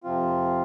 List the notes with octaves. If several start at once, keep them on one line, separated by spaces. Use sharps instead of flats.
F2 C3 F3 C4 F4